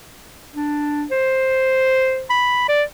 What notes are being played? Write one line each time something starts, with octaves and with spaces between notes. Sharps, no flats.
D4
C5
B5
D5